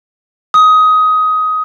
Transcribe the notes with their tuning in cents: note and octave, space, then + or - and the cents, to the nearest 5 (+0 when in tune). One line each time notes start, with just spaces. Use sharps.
D#6 +15